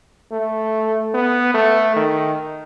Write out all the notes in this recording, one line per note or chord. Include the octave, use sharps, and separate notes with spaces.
A3
B3
A3
D#3